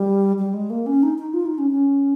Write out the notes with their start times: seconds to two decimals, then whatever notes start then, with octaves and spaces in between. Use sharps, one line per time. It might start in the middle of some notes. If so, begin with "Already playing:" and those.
Already playing: G3
0.38 G3
0.54 G#3
0.70 A#3
0.86 C#4
1.03 D#4
1.18 D#4
1.34 F4
1.46 D#4
1.58 C#4
1.71 C#4